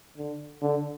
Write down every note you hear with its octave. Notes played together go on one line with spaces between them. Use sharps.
D3
D3